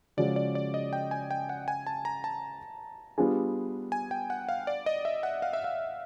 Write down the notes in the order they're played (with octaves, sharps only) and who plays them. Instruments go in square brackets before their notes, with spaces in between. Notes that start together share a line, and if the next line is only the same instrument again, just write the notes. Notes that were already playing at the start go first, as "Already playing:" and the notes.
[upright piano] C#3 F3 G#3 C#4 F#4 [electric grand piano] D5
[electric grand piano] D5
D5
D#5
G5
G#5
G5
F#5
G#5
A5
A#5
A5
[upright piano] G3 B3 D4 F4 G#4
[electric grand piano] G#5
G5
F#5
F5
D5
D#5
E5
F#5
F5
E5
F5